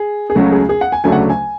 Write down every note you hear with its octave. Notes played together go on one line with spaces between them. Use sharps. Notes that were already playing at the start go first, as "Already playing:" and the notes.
Already playing: G#4
G#4
C#2 C#3 F#3 A3 F#4
G#4
G#4
F#5
G#5
D2 C#3 F#3 A3 D4 G#5
F#5
G#5